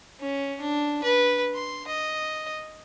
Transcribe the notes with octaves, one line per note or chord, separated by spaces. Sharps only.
C#4
D4
B4
C6
D#5